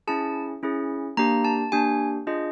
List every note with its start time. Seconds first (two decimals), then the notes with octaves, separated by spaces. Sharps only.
0.07 C#4 E4 G#4 A5
0.63 C#4 E4 G#4
1.17 A#3 D4 G4 A#5
1.45 A5
1.72 A#3 D4 G4 G#5
2.27 D4 F4 G#4 D#5